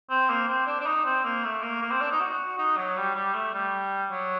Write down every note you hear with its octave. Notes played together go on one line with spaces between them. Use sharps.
C4
A#3
C4
D4
D4
D#4
C4
A#3
A3
A#3
A#3
C4
D4
D#4
F#4
D#4
F#3
G3
G3
A3
G3
F#3